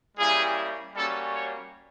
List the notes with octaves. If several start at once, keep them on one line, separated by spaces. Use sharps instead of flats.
G3 A#3 C#4 E4 G4 G#4
G3 A#3 C#4 F#4 A4
C#5